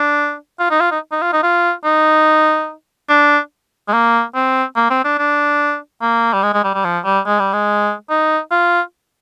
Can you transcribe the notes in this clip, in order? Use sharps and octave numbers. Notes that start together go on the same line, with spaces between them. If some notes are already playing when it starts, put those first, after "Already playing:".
Already playing: D4
F4
D#4
F4
D#4
D#4
F4
D#4
F4
D#4
D4
G#3
A#3
C4
A#3
C4
D4
D4
A#3
G3
G#3
G#3
G3
G3
F3
G3
G#3
G3
G#3
D#4
F4